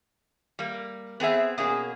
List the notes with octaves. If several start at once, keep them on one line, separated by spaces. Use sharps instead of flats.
G3 A#3
B3 C4 G#4 E5
B2 A#3 C#4 G#4